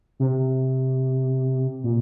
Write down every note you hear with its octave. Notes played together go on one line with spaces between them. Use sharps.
C3
A#2